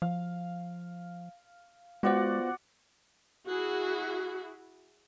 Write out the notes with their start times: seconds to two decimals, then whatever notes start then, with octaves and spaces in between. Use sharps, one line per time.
0.02 F3 F5
2.03 G#3 B3 F4 F#4 C5 D5 F#5
3.46 E4 F#4 G#4